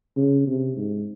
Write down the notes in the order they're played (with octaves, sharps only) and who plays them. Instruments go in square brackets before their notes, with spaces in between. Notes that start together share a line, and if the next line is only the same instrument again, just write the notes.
[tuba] C#3
C3
G#2